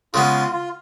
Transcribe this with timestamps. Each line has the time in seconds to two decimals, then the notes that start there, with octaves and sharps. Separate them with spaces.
0.14 C#3 G#3 B3 F4
0.53 F4